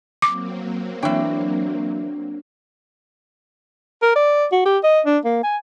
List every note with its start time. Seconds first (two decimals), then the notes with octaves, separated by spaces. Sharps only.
0.22 F#3 A#3 C4 D6
1.02 E3 D4 C#5 G5
4.02 A#4
4.16 D5
4.52 F#4
4.66 G4
4.83 D#5
5.06 D4
5.25 A#3
5.44 G#5